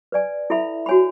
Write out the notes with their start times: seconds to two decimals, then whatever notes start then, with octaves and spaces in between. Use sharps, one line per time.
0.12 B4 D5 G#5
0.50 E4 A4 E5 B5
0.86 F#4 C#5 G#5 B5